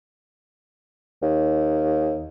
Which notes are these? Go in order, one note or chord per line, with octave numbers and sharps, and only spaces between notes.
D#2